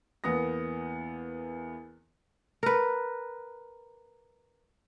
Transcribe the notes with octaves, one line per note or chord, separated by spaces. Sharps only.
E2 A#3 B3 D#6 A#6
A#4 B4